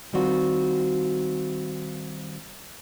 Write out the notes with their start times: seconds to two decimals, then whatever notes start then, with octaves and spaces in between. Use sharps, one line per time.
0.13 D#3 G3 C4 F4 F#4